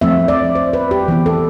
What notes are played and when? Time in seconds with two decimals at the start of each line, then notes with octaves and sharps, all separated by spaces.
0.01 F3 A3 C4 F4 E5
0.28 D5
0.55 C5
0.73 B4
0.91 G4
1.08 E3 B3 E4
1.26 A4